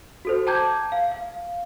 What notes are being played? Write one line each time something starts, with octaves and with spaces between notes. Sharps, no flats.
F#4 A4 C5
G5 A5 A#5 D6 G6 G#6
F5
F5